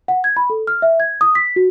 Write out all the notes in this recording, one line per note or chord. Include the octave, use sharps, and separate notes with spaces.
F#5
G#6
B5
A4
F6
E5
G#6
D#6
B6
F#4